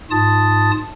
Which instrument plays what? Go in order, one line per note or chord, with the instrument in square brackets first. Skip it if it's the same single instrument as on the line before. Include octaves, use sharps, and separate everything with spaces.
[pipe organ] G#2 F4 A5 D#6 A6